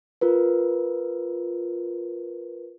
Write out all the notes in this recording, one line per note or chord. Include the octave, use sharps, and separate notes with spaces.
F4 A#4 B4